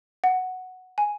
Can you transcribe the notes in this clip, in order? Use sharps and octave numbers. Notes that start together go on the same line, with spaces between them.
F#5
G#5